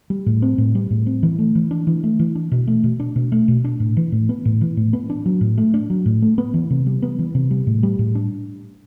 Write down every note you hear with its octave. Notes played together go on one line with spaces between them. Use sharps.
G3
A2
C4
A2
G3
A2
C4
E3
A3
E3
D4
E3
A3
E3
D4
B2
A3
B2
D4
B2
A3
B2
D4
A2
E3
A2
B3
A2
E3
A2
B3
D4
F#3
A2
A3
D4
F#3
A2
A3
B3
E3
C3
G3
B3
E3
C3
G3
A2
G3
A2
D4